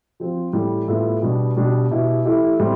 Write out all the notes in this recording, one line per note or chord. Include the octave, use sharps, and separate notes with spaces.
F3 C4 F4
A2 E3 G3
A2 G3 B3 F4
B2 G3 B3 D4
B2 G3 D4 G4
B2 B3 E4 G4
E3 A3 E4 G4
A2 G3 C4